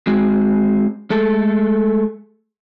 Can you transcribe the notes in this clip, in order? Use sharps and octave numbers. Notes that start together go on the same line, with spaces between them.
G#3 C4 F#4 G#4
G#3 A3 A4